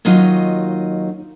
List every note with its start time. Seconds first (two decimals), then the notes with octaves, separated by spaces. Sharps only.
0.05 D#2 F#3 D#4 F4 D#5